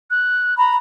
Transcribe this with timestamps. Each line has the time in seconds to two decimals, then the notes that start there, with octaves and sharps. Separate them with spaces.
0.10 F#6
0.58 A#5 B5